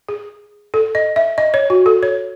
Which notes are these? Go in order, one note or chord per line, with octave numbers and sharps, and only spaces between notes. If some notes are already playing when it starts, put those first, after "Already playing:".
G#4
A4
D#5
E5
D#5
C#5
F#4
A4
C#5